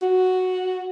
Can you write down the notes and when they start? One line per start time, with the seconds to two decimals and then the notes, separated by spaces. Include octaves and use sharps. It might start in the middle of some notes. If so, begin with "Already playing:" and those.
0.02 F#4